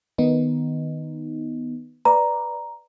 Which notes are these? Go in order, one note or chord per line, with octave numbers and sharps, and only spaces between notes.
D#3 B3 D#4
B4 D5 A#5